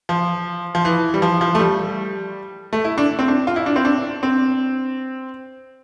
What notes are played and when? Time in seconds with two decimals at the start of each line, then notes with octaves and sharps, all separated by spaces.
0.09 F3
0.75 F3
0.85 E3
1.14 G3
1.22 F3
1.41 F3
1.55 A3
1.59 G3
2.73 A3
2.84 E4
2.98 D4
3.19 C4
3.28 D4
3.47 F4
3.56 E4
3.66 D4
3.76 C4
3.85 D4
4.23 C4